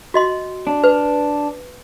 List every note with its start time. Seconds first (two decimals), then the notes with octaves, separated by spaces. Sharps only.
0.14 F#4 D#5 C6
0.67 D4
0.84 B4